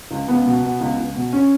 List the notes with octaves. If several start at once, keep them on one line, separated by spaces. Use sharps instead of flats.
C#2
C#2 B3
B2
B2
C#2
C#2
B2
C#4